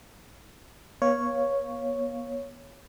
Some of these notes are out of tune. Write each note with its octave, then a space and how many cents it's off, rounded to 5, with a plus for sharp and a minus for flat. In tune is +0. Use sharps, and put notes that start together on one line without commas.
B3 -40 C#5 +0 F5 +0